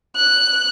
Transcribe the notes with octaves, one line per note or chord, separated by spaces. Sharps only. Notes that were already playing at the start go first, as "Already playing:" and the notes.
F#6